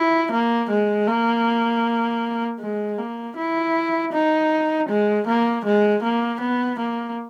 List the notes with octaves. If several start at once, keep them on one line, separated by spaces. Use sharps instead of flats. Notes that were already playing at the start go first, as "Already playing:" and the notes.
Already playing: E4
A#3
G#3
A#3
G#3
A#3
E4
D#4
G#3
A#3
G#3
A#3
B3
A#3